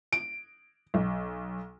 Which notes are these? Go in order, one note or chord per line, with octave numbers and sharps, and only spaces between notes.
D7
B1